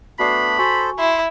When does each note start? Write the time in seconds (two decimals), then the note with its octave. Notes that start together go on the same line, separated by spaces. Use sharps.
0.19 A3 B3 D4 F#4 D5 B5 C7
0.59 F#4 A4 C5 G#5 C#6
0.99 E4 C6